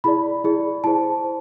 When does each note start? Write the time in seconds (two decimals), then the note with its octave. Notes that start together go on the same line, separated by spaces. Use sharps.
0.04 E4 G#4 D5 B5
0.44 E4 G#4 D5
0.84 E4 G#4 C5 A5
1.24 C5